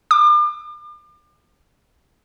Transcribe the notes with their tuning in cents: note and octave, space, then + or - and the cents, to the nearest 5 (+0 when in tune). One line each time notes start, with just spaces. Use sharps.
D6 +40